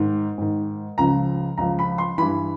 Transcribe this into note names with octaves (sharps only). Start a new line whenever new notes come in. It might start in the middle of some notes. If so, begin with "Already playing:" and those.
Already playing: G#2 D#3
G#2 D#3
C#2 C#3 F3 A#5
C#2 C#3 F3 A#5
B5
C6
G2 E3 B5